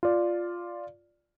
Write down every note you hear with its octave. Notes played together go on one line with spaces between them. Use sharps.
F4 D5